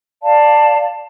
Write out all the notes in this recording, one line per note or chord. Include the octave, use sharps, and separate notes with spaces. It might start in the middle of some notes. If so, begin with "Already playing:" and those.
D5 F5 A5